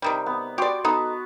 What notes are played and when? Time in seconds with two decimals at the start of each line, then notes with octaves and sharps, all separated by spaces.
0.02 C3 D#3 G3
0.26 B3
0.58 F#4 G4 D5 C6 D6
0.85 B3 D#4 A4